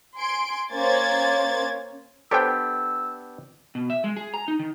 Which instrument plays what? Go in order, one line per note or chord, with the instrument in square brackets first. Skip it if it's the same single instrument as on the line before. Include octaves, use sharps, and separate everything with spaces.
[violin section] G#5 C6 D7
A#3 C#4 C5 G#6 A6
[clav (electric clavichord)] B3 D4 G4 [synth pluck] A4 C5 G5 [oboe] E6
[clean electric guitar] B2
E5
G#3
G#4
A#5
D#4
D#3